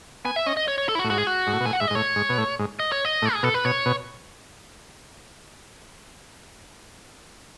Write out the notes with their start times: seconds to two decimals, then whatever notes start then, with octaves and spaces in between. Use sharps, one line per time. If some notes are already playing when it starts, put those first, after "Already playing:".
0.25 B3 G#5
0.36 E5
0.46 C#4 D#5
0.57 D#5
0.68 C#5
0.78 C#5
0.89 A4
0.95 E4
0.99 F#4
1.04 A2
1.10 G#2 F#4
1.18 G#4
1.27 F#4
1.47 G#2
1.53 A2
1.60 B2
1.66 A2 G#5
1.73 F#5
1.80 G#2 E5
1.88 D#5
1.90 G#2
1.95 A2 C#5
2.16 G#2
2.29 B2
2.38 A2
2.59 G#2
2.79 D#5
2.92 C#5
3.05 D#5
3.22 A2
3.33 G#4
3.43 B2 A4
3.54 B4
3.65 B2 C#5
3.86 B2